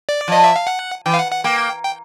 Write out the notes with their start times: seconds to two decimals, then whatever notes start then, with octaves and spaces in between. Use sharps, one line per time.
0.09 D5
0.28 F3 D#5
0.44 E5
0.56 F5
0.67 F#5
1.06 E3 G5
1.14 F5
1.19 F#5
1.32 F#5
1.44 A#3 G5
1.84 G5